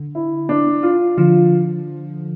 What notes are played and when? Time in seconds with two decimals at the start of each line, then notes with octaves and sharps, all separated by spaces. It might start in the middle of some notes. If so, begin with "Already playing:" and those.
Already playing: D3
0.15 E4
0.49 D4
0.83 F4
1.18 D3 F3 F4